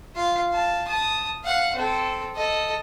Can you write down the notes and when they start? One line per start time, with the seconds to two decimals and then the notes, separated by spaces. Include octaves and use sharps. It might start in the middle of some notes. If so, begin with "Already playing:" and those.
0.15 F4 F5
0.50 F5 A5
0.87 A5 D#6
1.44 F5 F#5
1.76 C4 A4
2.36 A4 D#5